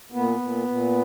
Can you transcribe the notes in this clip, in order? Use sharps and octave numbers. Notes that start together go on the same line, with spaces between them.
A#2 B3
A#2
A#2